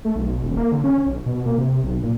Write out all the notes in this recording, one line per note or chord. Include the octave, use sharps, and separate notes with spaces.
A3
B1
D#1
A#3
D3
C#4
B1
B2
A#3
C3
B1
A#2